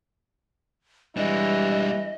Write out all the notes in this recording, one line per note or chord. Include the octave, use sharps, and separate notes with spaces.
E3 G3 G#3 D4 D#5